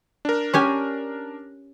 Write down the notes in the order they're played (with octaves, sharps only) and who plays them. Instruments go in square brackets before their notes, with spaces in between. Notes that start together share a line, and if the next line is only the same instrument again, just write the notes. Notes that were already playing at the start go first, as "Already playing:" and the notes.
[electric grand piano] D4 A#4
[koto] C#4 G4 G#5